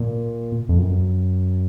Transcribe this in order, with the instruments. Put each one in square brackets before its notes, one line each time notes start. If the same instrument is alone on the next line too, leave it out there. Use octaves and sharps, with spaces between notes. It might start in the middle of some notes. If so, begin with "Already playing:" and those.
Already playing: [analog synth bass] A#2
F2
F#2